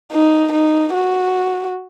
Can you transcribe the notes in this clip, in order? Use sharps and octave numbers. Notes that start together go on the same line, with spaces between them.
D#4
D#4
F#4